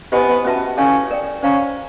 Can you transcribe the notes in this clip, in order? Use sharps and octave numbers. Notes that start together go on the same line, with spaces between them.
B3 E4 G4 C5 D#5 G#5
C#4 F#4 B4 E5 A5
C#4 E4 A4 C#5 F5 G#5
A#4 D5 G5
C#4 C5 F5 A#5